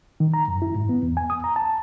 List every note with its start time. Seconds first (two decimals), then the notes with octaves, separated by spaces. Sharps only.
0.20 D#3
0.34 A#5
0.48 F#2
0.62 E4
0.75 G#2
0.89 B3
1.03 E2
1.17 G#5
1.30 D#6
1.44 A#5
1.56 A5